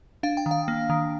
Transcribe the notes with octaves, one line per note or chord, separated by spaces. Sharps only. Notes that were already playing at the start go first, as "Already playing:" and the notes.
D4 F5
G5
D#3
F5
A#3
D#3